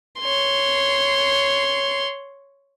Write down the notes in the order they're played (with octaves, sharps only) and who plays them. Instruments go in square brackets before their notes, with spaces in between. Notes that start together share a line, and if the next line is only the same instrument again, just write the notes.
[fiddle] C#5 C6